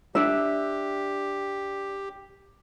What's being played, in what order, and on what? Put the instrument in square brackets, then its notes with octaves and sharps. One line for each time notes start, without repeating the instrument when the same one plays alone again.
[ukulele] D4 E5 [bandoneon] G4